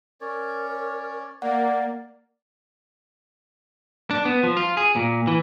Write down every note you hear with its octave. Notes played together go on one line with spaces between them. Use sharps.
C#4 A#4 C#5 D5
A#3 D5 F#5
D4
B3
F3
F4
G#4
A#2
E3